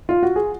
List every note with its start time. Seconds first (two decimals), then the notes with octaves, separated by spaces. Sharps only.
0.09 F4
0.23 F#4
0.36 G#4